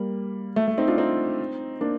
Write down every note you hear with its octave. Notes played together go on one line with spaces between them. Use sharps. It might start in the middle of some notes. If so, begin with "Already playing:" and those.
Already playing: G3 A#3
A3
A3
C4 D#4
D4 F4
C4 D#4
A#3 D4